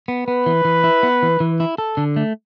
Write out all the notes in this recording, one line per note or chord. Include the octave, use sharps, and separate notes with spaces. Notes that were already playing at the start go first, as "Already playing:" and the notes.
B3
B3 B4
E3
E3
E4
B3
E3
E3
E4
A4
D3
A3